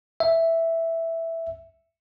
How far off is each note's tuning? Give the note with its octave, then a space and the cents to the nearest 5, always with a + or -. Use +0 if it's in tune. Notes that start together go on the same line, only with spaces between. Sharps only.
E5 +0